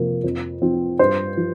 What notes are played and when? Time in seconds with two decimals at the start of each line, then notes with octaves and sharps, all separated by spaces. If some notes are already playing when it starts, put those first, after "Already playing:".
Already playing: F2 C3 F3 A#3
0.24 F2
0.62 F3 C4
0.99 G2 C5
1.37 F3